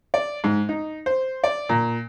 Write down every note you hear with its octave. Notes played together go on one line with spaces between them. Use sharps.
D5
G#2
D#4
C5
D5
A#2